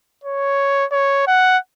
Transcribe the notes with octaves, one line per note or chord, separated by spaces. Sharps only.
C#5
C#5
F#5